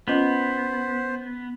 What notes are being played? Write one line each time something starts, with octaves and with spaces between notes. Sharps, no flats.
B3 C#4 F4 C5 D#5